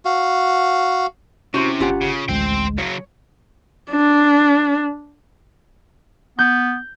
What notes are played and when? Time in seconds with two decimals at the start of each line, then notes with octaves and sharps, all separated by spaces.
0.05 F#4 F5
1.54 C3 C#4 E4 F#4 C5 C6
1.80 G1 C#4 F4 G4 F#5 A#5
2.01 C#3
2.28 A1 D2 G#3 C5 G5
2.78 C#3 F#3 C#5
3.91 D4
6.39 B3 G6